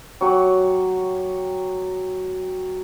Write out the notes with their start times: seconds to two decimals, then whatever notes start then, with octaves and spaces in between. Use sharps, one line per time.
0.21 F#3 G4 C#5 F#5